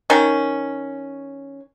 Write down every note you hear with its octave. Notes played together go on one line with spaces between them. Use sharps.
D#3 C#4